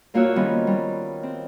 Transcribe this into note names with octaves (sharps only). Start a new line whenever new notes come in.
G2 A#3 F4 F#4 C#5 E6
D#3 F3 G3 B3 C#4 D#4
G3
C4